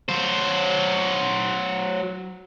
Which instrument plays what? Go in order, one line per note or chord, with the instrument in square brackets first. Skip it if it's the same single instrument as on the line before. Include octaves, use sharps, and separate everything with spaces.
[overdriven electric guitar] F#3 C5